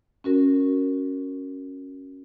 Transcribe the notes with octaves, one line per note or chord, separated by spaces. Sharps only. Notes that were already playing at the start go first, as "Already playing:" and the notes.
C#4 F#4 A#4